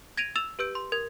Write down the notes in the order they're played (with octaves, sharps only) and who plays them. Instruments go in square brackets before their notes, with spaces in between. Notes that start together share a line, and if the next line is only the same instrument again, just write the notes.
[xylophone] G#6 A#6 D7 D#7 F7
E6 A6 E7 F7
G4 B4 E6 G6 D7
C6
A#4 G#6